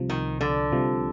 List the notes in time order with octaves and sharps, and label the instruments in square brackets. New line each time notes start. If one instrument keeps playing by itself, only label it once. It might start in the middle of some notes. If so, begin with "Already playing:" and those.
Already playing: [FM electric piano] C2 C3 F3
[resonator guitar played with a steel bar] D#3
D3
[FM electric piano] C2 C3 F3